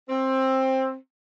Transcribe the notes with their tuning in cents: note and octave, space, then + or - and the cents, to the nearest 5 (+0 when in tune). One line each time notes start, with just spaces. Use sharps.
C4 +15